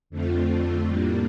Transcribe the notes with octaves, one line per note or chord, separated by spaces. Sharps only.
F2 D3 A3 C4 F4
A2 G3 A#3 D4